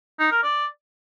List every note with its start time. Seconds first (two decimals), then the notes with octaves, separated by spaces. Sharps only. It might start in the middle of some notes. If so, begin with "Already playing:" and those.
0.19 D#4
0.31 A#4
0.43 D5